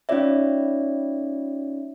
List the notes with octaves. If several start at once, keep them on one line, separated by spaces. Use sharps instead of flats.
C#4 D#4 F4 C#5 D5 E5